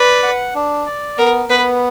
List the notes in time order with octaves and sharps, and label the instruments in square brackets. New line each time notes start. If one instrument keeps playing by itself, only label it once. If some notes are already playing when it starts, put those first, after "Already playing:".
Already playing: [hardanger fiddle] B4 [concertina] D5
[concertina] F#5
D4
D5
[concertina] B3 [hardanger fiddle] A#4
[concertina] B3 [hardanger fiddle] B4